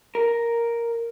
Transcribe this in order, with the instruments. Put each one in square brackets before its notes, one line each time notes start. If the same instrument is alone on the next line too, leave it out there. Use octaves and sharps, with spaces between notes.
[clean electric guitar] A#4